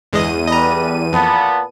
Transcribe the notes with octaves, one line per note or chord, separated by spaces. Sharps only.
G1 E2 G#3 D#5 D#7
G3 A4 B4 D#5 A#5
F2 A#2 B3 A5